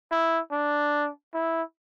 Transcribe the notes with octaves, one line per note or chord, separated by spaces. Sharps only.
E4
D4
E4